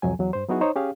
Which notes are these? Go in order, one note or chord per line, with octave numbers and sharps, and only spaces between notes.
C2 F2 F#3 G#5
E2 F#3
G2 C5
F#3 B3 D#4 E4 F#4 G#4
D#4 C5 C#5
C#4 G4 G#4 F5